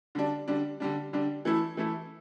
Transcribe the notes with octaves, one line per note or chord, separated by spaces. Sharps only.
D3 G3 D4
D3 G3 D4
D3 G3 D4
D3 G3 D4
E3 A3 E4
E3 A3 E4